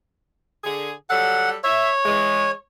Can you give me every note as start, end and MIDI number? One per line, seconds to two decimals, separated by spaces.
0.64 0.92 50
0.64 0.92 68
1.10 1.55 54
1.10 1.55 55
1.10 1.55 69
1.10 1.50 78
1.64 2.51 73
1.64 1.89 76
2.06 2.48 52
2.06 2.48 56